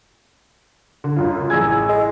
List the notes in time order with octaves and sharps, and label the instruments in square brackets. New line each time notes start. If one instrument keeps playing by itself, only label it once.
[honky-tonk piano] D3
C#2 F#2 F4
[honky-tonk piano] A1 E6 G#6 [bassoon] G#4
[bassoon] G#3